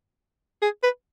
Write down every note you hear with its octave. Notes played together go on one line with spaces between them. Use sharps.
G#4
B4